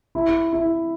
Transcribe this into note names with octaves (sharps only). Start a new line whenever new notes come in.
E4
E4